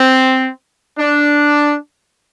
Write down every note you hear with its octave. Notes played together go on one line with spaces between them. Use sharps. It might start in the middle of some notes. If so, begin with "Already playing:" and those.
Already playing: C4
D4